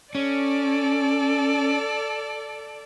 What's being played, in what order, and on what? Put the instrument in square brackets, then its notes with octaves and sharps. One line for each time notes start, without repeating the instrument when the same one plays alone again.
[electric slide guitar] C#4 [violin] A4 D5